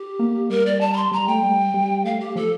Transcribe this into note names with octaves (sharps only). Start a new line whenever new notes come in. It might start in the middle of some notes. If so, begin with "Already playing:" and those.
Already playing: G4
A#3
G3 A#4
D5
A5
A#5
C6
G3 A#5
A3 G5
G3
G3
A3 F5
G4
F3 A4